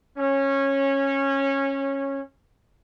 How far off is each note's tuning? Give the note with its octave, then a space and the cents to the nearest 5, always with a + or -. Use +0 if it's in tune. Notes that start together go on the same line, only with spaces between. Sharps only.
C#4 -15